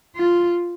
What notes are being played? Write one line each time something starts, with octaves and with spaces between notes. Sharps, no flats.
F4